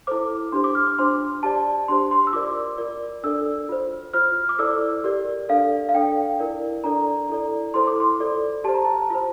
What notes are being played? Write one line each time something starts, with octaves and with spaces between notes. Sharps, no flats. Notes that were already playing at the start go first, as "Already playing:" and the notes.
E4 A4 C5 D6
D4 G4 C5 C6
D6
F6
D6
D4 F4 C5 C6
G4 D5 A5
D4 G4 C5 C6
C6
E6
F4 A#4 D5 D6
F4 A#4 D5
D4 A4 D5 E6
F4 C5
F4 C5 F6
D6
E4 A4 D5 E6
G4 A#4 D5
D4 A4 D5 F5
F5
D4 A4 D5 G5
E4 A#4 D5
D4 A4 D5 A#5
E4 A4 D5
E4 A4 C5 C6
D6
C6
F4 A4 D5
G4 C5 A5
A#5
A5
F4 C5